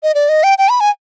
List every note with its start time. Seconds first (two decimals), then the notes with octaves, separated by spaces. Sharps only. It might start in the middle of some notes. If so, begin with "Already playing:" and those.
0.03 D#5
0.15 D5
0.29 D#5
0.43 G5
0.58 G5
0.69 B5
0.80 G#5